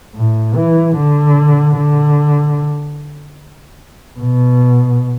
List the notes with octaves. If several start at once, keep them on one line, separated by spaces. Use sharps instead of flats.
A2
E3
D3
D3
B2